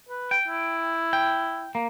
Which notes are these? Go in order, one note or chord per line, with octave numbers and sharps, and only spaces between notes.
B4
G5
E4
G5
A#3